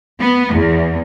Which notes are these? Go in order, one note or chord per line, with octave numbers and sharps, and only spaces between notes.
B3
E2